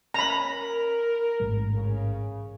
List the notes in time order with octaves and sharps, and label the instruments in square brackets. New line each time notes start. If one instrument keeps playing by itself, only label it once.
[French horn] C#4 [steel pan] A#5 B5
[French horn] A#4
[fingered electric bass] A1 G#2 G#3
[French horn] C#3